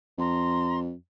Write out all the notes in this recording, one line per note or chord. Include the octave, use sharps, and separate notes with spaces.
F2 A#5 C6